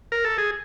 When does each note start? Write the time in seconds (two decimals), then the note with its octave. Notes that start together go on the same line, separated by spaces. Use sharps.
0.12 A#4
0.25 A4
0.38 G#4